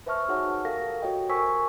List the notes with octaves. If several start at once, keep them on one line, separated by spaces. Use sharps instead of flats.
B4 C5 E5 A5 C#6 F6
D#4 F#4 G#4 C#5 F#5 F6
G4 A4 A#4 F5 A#6
F#4 G4 C#5 D#5 G5
A#4 C5 G#5 C#6 E6 B6